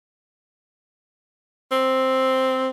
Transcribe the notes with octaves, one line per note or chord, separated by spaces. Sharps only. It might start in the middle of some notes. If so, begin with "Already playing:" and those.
C4